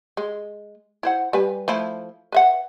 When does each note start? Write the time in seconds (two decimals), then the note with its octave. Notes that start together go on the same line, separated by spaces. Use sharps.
0.17 G#3
1.03 E4 C5 F#5
1.33 G3 B4 G#5
1.68 F3 A3 E4
2.32 B4 E5 F#5